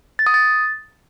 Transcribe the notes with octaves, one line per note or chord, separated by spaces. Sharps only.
A6
D#6
A6